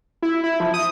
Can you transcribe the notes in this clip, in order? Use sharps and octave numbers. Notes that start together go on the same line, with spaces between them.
E4
E4
F3
D#6